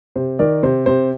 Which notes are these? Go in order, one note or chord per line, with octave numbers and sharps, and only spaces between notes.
C3 C5
D#3 A#4 D5
C3 C5
C3 C5